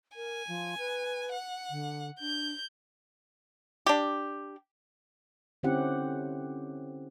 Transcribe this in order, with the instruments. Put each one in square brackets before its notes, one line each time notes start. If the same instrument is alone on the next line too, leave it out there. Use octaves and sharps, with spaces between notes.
[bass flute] A#4 [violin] G#5
[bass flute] F3
B4
[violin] F#5
[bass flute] D3
[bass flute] D4 [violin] G6
[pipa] D4 G4
[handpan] D3 C4 C#4 E4 G4 F#5